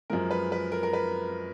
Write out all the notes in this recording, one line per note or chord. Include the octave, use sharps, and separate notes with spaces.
F#2 F3 G#3 A#4
B4
B4
A#4
A#4
B4